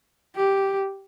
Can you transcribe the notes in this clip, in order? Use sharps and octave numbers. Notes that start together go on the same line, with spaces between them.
G4